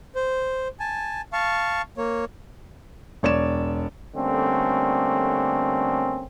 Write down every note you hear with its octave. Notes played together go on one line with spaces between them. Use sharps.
C5
G#5 A5
F5 A5 C#6
A#3 C#5
E1 C#5 D5 E7
D3 G3 A3 A#3 C4 C#4